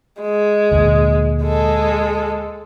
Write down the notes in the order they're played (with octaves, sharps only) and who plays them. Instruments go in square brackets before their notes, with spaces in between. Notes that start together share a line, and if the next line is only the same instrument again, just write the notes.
[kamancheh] G#3
[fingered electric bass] D2 A#2 D3
[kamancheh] G#3 A4